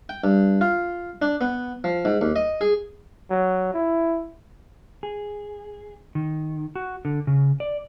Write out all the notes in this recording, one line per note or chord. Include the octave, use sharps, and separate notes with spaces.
G5
G2
F4
D4
B3
F3
G#2
D#2
D#5
G#4
F#3
E4
G#4
D#3
F#4
D3
C#3
D5